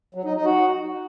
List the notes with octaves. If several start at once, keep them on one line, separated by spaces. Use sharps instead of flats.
F#3
D#4
D#4
F#4